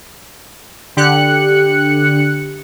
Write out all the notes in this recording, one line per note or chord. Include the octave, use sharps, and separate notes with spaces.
D3 G4 F#6 C#7